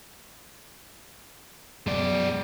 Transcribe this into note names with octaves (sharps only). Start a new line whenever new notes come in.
F#2 B2 G#3 D5